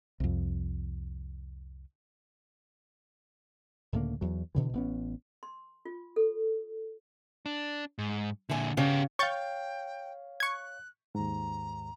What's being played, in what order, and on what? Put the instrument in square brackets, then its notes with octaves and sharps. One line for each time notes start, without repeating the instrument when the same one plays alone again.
[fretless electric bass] C2 F2
[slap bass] C#2 A2 D3 A#3
E2 F#3
B2 D3 E3
A1 B3 C#4
[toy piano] C6
F4
A4
[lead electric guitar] D4
G#2
[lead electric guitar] A#2 D3 [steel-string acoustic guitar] E5 G#5
[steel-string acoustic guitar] C#3 [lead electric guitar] B3 G4
[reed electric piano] C#5 F5 [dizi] G5 [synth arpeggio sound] C#6 G6 A6
[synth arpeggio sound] C#6 G#6 [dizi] F#6
[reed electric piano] D#2 G#2 [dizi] A#5